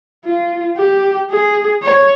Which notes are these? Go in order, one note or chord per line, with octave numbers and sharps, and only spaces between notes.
F4
G4
G#4
C#5